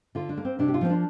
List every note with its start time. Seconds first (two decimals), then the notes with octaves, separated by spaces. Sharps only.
0.15 D3 F4
0.29 D4
0.37 A#3
0.45 C4
0.59 C3 D4
0.68 G4
0.74 F4
0.81 F3 A#3 C4
0.89 D4